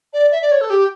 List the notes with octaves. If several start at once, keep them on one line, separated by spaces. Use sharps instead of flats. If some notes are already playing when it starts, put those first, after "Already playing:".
D5
E5
D5
C#5
A4
G4